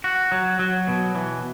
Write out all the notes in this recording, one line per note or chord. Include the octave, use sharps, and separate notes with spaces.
F#4
F#3
F#3
B2
E3